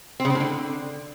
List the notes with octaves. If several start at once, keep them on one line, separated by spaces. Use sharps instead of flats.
C4
C#3
C4
A2
D3